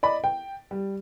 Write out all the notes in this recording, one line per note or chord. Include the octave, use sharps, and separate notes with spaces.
D5 D#5 B5
G5
G3